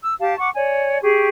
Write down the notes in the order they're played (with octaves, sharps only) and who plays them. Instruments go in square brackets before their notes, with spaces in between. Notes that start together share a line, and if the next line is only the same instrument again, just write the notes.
[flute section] E6
G4 F5 A5
F#5 C#6 D6
C#5 D5 G#5
G4 G#4 C#6